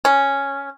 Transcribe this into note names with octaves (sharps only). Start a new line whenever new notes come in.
C#4